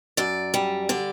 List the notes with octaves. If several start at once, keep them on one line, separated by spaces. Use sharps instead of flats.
F#2 D5
G3
D3 D5